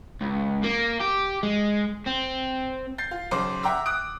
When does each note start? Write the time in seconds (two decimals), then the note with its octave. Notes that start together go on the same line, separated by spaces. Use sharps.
0.21 C#2
0.64 A#3
1.01 G4
1.43 G#3
2.07 C4
2.98 G6 A6 C7
3.11 F4
3.31 B1 C#3 C5 D6
3.63 E5 F#5 G5 A#5 D6 E6
3.86 D#6 F#6 D7